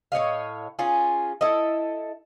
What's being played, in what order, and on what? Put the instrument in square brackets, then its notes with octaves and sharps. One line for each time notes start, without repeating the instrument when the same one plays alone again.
[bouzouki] A2 C#5 D#5 F5
C#4 F4 G#4
E4 A4 D#5